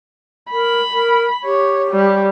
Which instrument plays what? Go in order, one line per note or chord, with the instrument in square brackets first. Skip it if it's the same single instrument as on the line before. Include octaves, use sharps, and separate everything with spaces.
[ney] A#4 [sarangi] B5
[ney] A#4
[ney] G4 [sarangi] C#5
[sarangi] G3